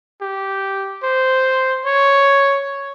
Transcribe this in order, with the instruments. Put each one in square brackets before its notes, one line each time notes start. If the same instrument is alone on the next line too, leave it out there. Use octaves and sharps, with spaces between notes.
[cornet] G4
C5
C#5